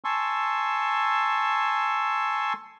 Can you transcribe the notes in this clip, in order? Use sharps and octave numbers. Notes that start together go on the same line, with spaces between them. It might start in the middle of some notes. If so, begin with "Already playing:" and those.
G#5 A5 C6 C#6 E6